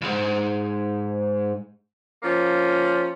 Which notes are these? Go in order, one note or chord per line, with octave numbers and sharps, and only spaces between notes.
C#2 G#2
F3 A#3 C#4